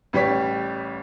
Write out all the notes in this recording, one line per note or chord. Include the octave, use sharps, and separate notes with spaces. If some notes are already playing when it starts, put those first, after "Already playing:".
A1 G3 G4 C#5 B6